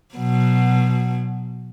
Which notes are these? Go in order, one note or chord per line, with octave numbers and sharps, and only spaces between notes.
B2 F#3